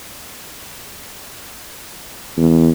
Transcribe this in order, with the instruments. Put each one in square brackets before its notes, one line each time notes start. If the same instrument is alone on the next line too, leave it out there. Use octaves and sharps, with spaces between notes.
[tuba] E2